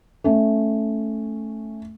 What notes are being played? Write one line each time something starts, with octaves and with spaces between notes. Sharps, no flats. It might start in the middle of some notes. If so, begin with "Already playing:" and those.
A3 C#4